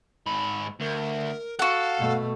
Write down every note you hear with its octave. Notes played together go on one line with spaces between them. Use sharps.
G#2 B5
D2 A#4
F#4 A4 F5 F#5
B2 A3